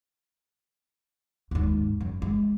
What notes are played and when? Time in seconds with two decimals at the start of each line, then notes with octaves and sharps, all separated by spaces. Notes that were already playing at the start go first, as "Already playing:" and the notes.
1.51 D#2 G#2
2.01 F#2
2.22 G#3